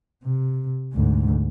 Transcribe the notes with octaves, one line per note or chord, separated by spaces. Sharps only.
C3
D2 G#2